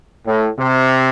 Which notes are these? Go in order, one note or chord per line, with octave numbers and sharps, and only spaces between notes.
A2
C3